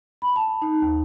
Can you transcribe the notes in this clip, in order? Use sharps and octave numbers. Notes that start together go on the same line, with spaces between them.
B5
A5
D#4
D#2